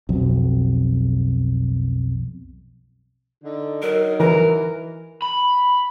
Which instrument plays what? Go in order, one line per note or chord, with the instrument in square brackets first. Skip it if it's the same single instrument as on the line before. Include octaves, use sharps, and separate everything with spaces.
[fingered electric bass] B1 F2
[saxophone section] D3 D#4
[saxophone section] F#3 D#4 [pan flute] A#4
[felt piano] E3 [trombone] A#4 [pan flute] B4
[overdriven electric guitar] B5